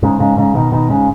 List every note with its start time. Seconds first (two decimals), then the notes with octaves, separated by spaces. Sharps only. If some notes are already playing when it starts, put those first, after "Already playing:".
0.03 G#2 C#3
0.19 G#2 C#3
0.37 G#2 C#3
0.55 B2 D#3
0.72 B2 D#3
0.90 G#2 C#3